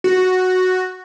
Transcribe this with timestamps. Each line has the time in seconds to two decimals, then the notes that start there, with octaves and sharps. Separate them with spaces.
0.04 F#4